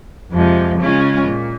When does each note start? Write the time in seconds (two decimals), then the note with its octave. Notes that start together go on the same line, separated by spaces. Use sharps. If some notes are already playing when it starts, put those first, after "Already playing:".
0.31 F2 C3 F3 G#3
0.79 C#3 G#3 C#4 F4
1.26 A#2